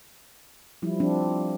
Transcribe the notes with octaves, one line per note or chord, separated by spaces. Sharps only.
F3 G3 E4
F3 C4 D4 F4